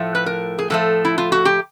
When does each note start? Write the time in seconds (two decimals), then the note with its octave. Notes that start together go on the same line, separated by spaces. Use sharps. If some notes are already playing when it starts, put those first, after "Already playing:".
Already playing: A2 F3 A3
0.15 B4
0.26 A#4
0.59 G#4
0.70 A2 F3 A3 A4
1.05 E4
1.18 F4
1.32 F#4
1.45 G4